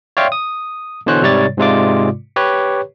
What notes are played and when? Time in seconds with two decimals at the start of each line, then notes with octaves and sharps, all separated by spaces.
0.17 C#5 D5 E5 F5 G5 C6
0.32 D#6
1.06 B2 D3 E3 C5 C#5 F#6
1.23 G#2 C3 G3 C#5 D5 A6
1.58 G#2 C3 G#3 F4 D5 D6
2.36 G4 B4 C#5